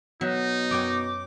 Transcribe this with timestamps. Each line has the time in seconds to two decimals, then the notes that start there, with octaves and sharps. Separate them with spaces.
0.21 B2 F#3 D#4 E5
0.71 F#2 C#5 G5 D6